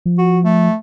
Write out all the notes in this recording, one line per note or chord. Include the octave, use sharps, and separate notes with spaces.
F3
F#4
A3